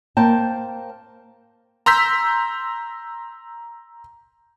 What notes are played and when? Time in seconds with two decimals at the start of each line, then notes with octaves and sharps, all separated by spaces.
0.17 A#3 C5 G5 A5
1.86 A#5 C6 E6 G6 B6